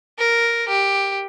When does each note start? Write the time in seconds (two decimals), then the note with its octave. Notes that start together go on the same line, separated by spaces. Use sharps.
0.19 A#4
0.69 G4